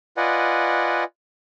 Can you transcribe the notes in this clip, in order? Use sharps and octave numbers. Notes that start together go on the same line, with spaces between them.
F4 B4 D5 D#5 F#5 G#5